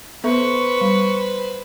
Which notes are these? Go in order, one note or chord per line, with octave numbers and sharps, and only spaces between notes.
B3 A4 B4 C5 E5 C#6
G3